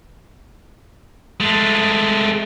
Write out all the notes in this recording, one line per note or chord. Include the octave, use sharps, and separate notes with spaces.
G#3 A3